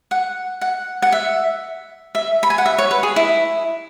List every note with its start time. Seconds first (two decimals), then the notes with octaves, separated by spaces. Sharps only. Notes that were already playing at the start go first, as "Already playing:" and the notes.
0.11 F#5
0.61 F#5
1.02 F#5
1.12 E5
2.15 E5
2.43 B5
2.50 G#5
2.58 F#5
2.66 E5
2.78 C#5
2.91 B4
3.03 G#4
3.16 E4